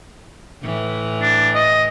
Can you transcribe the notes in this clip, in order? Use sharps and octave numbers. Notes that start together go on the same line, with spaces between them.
A2 E3
D4
D#5